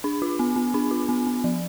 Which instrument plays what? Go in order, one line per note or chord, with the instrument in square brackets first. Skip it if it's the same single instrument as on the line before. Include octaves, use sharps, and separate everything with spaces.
[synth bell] D4
F4
B3
B3
D4
F4
B3
B3
F3